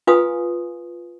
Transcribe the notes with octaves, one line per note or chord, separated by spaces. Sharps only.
F4 B4 F5 G#5 C6 D#6